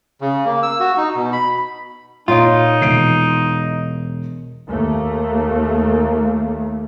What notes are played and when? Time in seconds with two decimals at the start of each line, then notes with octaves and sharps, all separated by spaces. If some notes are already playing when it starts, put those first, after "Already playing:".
0.21 C#3
0.46 A#3
0.63 E6
0.80 F#4
0.97 D#4
1.15 B2
1.33 B5
2.28 A#2 D#4 F4 C#5 D7
2.81 E1 C7 D7
4.68 D#2 A3 A#3